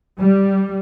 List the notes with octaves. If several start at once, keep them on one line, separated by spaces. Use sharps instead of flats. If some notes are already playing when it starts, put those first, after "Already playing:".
G3